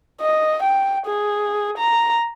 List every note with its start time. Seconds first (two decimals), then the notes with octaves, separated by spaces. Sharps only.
0.21 D#5
0.63 G5
1.07 G#4
1.78 A#5